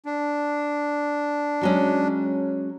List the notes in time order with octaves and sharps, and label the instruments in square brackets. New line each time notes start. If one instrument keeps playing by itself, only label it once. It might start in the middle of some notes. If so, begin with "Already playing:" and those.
[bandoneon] D4
[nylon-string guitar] F#3 G#3 C#4